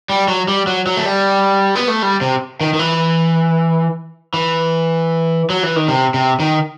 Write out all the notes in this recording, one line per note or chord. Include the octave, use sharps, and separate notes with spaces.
G3
F#3
G3
F#3
F#3
A3
G3
B3
A3
G3
C3
D#3
D#3
E3
E3
F#3
E3
D#3
C3
C3
D#3